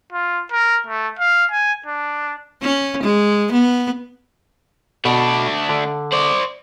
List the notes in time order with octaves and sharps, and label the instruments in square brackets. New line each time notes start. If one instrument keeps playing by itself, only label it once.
[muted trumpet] F4
A#4
A3
F5
G#5
D4
[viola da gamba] C#4
G#3
B3
[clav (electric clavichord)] B2 [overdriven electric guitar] A3 D4
[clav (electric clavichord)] D3
[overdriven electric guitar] C5 D5